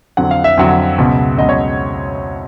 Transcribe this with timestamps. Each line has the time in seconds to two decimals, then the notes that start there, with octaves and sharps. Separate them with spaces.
0.17 F2 D3 F#3 F#5
0.31 F5
0.44 E5
0.57 F2 D3 F#3
0.98 C#2 B2 F#3
1.38 C#2 B2 F#3 D#5
1.49 C#5